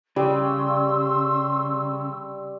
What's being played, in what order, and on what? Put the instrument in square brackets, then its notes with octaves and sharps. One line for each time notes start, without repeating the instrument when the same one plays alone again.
[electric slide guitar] C#3 [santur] G3 [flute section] C6 C#6 E6